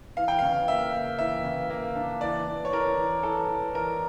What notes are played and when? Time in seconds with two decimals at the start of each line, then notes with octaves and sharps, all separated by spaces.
0.17 E3 F5
0.28 G5
0.39 C#3 F5
0.68 A#3 E5
0.93 A#3
1.19 E3 E5
1.44 C#3
1.70 A#3
1.96 D4
2.21 E3 D5
2.47 E3
2.65 C#5
2.72 E3 A#4
2.98 E3
3.23 E3 A4
3.49 E3
3.75 E3 A#4